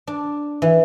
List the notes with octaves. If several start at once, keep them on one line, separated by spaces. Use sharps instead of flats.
D4
E3